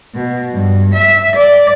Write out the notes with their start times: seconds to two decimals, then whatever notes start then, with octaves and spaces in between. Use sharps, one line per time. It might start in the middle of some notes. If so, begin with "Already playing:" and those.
0.14 B2
0.53 G2
0.92 E5
1.36 D5